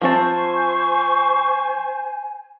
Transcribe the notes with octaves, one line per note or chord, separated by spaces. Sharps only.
F3 C4 C5 G#5 A5 C#6